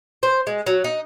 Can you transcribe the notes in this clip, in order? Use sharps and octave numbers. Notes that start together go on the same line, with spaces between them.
C5
G#3
F#3
D#4